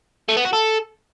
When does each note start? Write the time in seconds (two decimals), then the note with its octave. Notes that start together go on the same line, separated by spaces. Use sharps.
0.28 A3
0.37 B3
0.45 F#4
0.53 A4